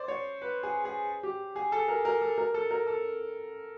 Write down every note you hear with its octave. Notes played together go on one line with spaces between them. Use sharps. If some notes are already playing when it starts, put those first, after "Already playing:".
Already playing: C5 D5
C#5
B4
G#4
G#4
G4
G#4
A4
A#4
A#4
A4
A#4
A4
A#4
A4